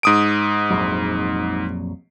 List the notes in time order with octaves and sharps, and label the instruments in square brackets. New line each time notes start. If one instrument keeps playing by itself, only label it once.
[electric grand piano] G#2 D#6 D7
[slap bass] A#1 F2 F#3